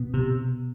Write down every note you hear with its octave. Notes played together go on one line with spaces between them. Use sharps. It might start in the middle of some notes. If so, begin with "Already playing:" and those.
Already playing: B2 B3
C3